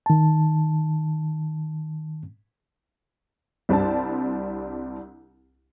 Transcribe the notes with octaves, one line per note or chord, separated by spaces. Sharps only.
D#3 A5
C2 G3 C4 D4 A5